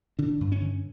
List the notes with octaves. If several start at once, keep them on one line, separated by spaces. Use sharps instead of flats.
D3 D4
G2
C#4
D3